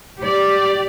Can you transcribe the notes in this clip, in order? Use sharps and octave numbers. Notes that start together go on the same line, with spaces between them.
G4 D5